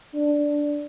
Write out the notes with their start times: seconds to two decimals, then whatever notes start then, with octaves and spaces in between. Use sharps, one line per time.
0.14 D4